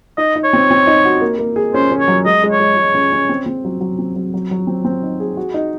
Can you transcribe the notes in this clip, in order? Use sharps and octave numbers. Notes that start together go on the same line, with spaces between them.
D#4 D#5
D#4
C#5
C4
C4
D#4
F#4
A#3
A#3
G#4
C#4 C5
C#4
C#5
F#3
G#3 D#5
G#3
C#5
G#3
G#3
C#4
C#4
C4
C4
F#3
F#3
C4
F#3
F#3
F#3
C4
C4
D#4
G#4
F#4
D#4